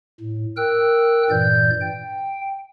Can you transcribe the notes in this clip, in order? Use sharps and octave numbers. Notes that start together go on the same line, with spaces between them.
A2
A#4 G5 E6 F#6
G2 A#2 E3 D5 G6
G5